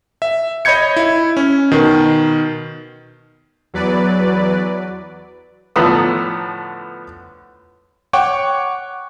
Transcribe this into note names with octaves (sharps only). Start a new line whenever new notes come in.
E5
C#5 D#5 B5 G6 G#6 C#7
E4
C#4
B2 D#3
E2 F#3 B4 D5
A2 D3 F3 B3 A#5 D#6
C#5 F#5 G5 C#6 D6